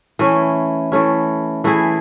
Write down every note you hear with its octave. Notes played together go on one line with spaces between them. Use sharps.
E3 A3 C#4
E3 A3 C#4
E3 A3 E4 G#4